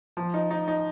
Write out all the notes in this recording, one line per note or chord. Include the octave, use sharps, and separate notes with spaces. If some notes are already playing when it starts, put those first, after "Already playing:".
F3
D#4
D#4
D#4